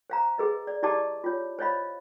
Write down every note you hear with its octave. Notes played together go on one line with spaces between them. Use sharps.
C5 F5 A#5
G#4 B4 D#5
D5
E4 G4 D5 D#5 A5 D6
F4 C#5
C5 C#5 D#5 F5 B5